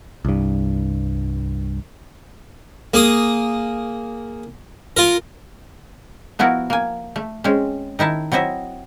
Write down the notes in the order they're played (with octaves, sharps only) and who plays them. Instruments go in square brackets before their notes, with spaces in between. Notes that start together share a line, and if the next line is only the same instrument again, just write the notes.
[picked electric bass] C2 G2
[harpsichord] A#3 G#4 D#6
F4 A#4
[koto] F3 B3 E4 F#4 A#4
A#3 G#5
A3
G#3 C4 C#4
D#3 D#4 E4 A5
F#3 C4 E4 D#5 E5